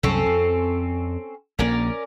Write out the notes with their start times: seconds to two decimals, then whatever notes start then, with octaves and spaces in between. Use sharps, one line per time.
0.03 C2 F#2 C4 C#4 A4
0.26 F2
1.59 A#1 C#3 A#3 C#4 A#4 D5